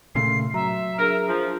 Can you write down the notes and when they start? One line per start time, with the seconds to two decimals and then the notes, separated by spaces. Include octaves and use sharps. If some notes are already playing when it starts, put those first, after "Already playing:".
0.15 A#2 C#3 A3 C6 C7
0.54 F#3 E5 A#5
0.99 D4 G#4 A#4
1.28 F3